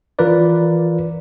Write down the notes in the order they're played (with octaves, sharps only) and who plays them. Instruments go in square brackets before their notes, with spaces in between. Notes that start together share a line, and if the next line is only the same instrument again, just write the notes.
[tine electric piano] E3 F4 A#4 B4 D5